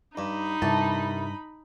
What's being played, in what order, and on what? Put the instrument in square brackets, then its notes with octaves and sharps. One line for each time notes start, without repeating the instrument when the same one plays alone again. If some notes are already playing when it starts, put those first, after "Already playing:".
[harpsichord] G2 [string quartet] D#4 B5
[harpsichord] C2 [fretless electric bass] G2 [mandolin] A5